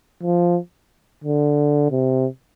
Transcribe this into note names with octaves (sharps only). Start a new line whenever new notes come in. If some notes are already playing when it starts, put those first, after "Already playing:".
F3
D3
C3